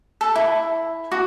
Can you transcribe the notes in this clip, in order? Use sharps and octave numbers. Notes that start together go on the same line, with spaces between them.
A4
E4
F#4